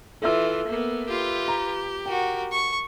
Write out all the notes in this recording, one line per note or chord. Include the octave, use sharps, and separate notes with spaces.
E3 F4 A4 E5 E6
A#3 B3
F4 G4 B4
A#5
F#4 A#4 G5
C#6